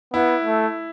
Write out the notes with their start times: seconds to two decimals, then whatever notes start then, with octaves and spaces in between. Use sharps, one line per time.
0.14 B3 E4
0.45 A3